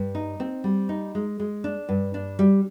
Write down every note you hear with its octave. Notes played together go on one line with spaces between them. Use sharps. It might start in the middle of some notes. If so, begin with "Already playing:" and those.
Already playing: G2
D#4
C4
G3
D#4
G#3
G#3
D4
G2
D4
G3